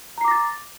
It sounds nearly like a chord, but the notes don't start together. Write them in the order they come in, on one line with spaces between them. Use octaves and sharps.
A#5 C7 D6 A#6 A6